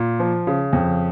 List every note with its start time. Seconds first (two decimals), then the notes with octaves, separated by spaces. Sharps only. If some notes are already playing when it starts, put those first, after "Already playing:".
Already playing: A#2
0.20 F3
0.47 C#3
0.73 F2